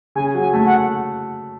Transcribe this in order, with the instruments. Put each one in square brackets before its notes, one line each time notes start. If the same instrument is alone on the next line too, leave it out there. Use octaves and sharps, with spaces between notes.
[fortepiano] C#3 [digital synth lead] G#5
[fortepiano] F#3
[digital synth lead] G#5
[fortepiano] A3
[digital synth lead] F#5